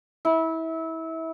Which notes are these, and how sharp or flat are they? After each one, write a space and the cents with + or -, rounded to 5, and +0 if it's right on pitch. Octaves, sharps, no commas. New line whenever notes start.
E4 -25